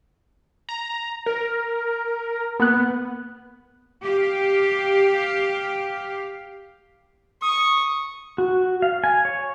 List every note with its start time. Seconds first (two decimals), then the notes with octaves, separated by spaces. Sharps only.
0.69 A#5
1.26 A#4
2.60 A#3 B3 F#6
4.03 G4 F5
7.42 C#6 D#6
8.38 F#4
8.82 F5
9.04 G#5
9.25 C#5